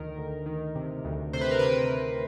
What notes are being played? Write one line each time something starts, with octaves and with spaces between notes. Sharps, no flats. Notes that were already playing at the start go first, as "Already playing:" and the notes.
Already playing: D2 D#3 A#4
D2
D#3
C3
D2
C3 C5
B4
A#4
C3 B4
C3